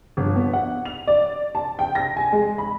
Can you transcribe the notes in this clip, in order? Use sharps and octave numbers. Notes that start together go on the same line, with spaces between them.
G1
B3
F#5
F7
D5
A5
G5
A#6
G#5
G#3
B5